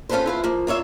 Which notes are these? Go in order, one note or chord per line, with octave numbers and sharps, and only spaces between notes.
C#4 F4 G#4 A4 B4 C5
E4 F4 B4
F3 A#3
A#3 F4 C#5 E5